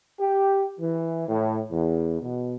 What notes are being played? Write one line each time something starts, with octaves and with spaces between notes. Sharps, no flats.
G4
E3
A2
E2
B2